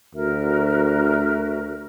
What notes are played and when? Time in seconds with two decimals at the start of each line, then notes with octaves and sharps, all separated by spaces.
0.15 D2 F#4 A#4 E5